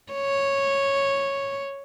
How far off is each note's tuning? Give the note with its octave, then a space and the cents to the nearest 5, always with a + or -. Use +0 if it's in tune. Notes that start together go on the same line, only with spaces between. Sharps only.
C#5 -5